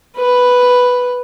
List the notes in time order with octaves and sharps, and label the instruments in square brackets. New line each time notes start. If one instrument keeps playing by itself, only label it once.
[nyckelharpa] B4